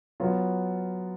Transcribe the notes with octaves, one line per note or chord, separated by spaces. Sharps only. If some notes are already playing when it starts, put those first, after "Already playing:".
F#3 B3 F4